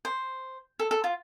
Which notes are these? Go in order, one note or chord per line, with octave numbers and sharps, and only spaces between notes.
C5
A4
A4
F4